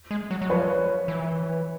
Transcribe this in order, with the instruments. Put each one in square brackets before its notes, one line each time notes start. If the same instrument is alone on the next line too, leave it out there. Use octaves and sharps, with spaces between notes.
[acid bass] G#3
F#3
F#3
[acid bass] F3 [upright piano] B4 C#5
[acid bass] E3